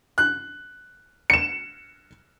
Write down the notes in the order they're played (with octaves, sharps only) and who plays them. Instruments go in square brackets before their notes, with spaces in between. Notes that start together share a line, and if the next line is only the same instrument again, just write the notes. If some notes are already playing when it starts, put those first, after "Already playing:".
[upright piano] F#6
[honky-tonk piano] C#7 E7